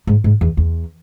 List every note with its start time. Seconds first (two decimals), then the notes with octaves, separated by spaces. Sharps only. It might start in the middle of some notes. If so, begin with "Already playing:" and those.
0.07 G#2
0.24 G#2
0.41 E2
0.57 E2